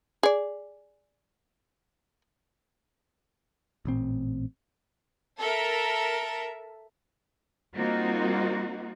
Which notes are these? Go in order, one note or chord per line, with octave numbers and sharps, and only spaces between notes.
G#4 D5
A1 A#2 C4
A4 A#4 E5
G3 A#3 C4 D#4 F4 F#4